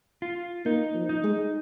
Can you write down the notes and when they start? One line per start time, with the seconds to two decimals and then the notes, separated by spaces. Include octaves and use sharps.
0.22 F4
0.66 A#3 D#4
0.95 F3
1.09 D#4
1.24 G#3